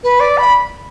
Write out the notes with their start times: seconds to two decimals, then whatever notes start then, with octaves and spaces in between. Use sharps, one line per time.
0.03 B4
0.20 D5
0.38 B5